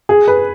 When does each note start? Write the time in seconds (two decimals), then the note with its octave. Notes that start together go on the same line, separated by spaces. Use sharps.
0.09 G#4
0.28 B4